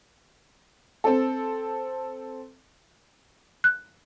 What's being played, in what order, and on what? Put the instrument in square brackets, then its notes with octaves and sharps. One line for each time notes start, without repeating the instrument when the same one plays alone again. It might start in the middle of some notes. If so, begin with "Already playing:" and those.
[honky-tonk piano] C4 A4
[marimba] F#6